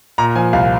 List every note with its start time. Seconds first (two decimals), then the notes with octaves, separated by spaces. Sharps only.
0.18 A#2 A#5
0.35 F3 G#5
0.53 C2 F5